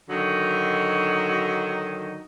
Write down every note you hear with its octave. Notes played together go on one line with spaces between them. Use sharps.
D3 D#3 F#3 D#4 F#4